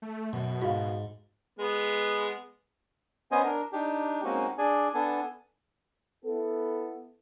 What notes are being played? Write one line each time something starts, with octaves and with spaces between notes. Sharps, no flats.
A3
F#2 B2
G#2 F#4 F5
G#3 B3
B3 C#4 C5 D#5 G#5
D4 A#4
D4 D#4 G4
G#3 A#3 C4 C#4 D#4 F#4
D4 G#4 D5 G#5
B3 D4 A4 G#5
B3 E4 A4